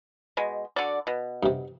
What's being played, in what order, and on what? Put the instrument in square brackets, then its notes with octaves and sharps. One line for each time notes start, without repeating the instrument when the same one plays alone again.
[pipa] B2 G#3
D3 F#4 D5
B2
[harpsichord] G2 C3